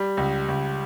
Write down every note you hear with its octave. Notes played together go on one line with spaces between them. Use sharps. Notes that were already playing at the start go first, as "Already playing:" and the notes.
Already playing: G3
C#2
C#2